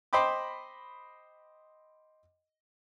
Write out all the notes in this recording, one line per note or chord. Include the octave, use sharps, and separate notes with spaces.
C5 D#5 G5 B5 D6